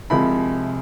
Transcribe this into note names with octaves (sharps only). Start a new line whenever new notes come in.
C2 C3 F3 G#3 B5